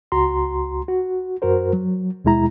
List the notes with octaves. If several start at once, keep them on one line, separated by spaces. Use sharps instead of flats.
C#2 F#4 A#5 C6
F#4
F#2 F#4 A#4 C5
F#3
D#2 B2 G#3 E4 A#5